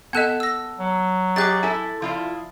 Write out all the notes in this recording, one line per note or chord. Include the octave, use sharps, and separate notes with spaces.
B3 A4 D#5 F#5 A5 F#6 E7
E6 A#6
F#3
G4 G#4 D#5 D6 F#6 A6
E4 A4 G#5
F3 E4 F4 D5